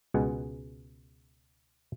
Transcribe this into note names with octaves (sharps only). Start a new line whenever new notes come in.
C#2 B2 G#3 G#4 F#5